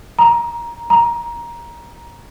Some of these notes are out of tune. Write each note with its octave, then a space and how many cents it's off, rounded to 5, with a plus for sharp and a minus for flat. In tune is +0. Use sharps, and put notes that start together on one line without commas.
A#5 +15
A#5 +15